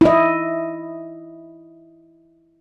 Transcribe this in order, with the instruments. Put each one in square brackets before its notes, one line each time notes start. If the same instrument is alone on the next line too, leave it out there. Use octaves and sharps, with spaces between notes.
[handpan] E4 D#5